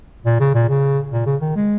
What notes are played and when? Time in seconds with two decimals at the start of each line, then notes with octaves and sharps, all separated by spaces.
0.25 A#2
0.40 C#3
0.54 A#2
0.69 C#3
1.12 A#2
1.26 C#3
1.41 D#3
1.56 G#3